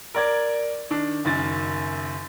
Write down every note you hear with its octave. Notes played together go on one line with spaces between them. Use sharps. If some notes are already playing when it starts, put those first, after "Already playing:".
A#4 D5 G#6
D#3 D4
F#1 F#2 D#3 A6